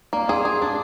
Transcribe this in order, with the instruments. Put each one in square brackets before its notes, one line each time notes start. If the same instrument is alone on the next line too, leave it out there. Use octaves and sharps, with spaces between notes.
[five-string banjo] A#3 [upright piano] D5
[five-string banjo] G#4 [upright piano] C6
[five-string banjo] G#4 [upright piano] D6
[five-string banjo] D4 [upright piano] D6